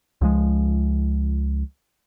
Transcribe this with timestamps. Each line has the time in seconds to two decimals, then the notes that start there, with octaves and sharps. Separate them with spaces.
0.21 C#2 F3 G#3